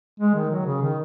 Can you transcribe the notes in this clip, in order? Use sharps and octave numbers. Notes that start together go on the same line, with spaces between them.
G#3
D#3
F#3
C#3
D#3